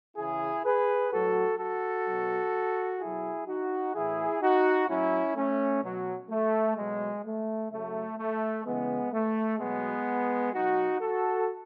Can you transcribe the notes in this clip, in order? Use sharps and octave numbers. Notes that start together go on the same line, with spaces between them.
C#3 E3 E4 G#4
G#4 B4
A2 F#3 F#4 A4
F#4 A4
B2 F#3
B2 F#3 E4 G#4
D#4 F#4
A2 E3 E4 G#4
D#4 F#4
A2 F#3 C#4 E4
A3 C#4
B2 F#3
A3
B2 F#3 G#3
A3
C#3 F#3 A3
A3
C#3 E3 G#3 B3
A3
B2 F#3 G#3 B3
B2 F#3 D#4 F#4
F#4 A4